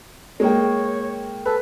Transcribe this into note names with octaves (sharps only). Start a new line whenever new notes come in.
G#3 A#3 C#5 G5
A4 B4